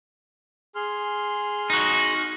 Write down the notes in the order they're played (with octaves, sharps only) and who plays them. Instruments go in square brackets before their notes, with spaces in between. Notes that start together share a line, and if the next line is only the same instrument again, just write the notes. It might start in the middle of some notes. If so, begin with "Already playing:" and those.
[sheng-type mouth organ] G#4 C6 F6
[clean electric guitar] D#4 F#4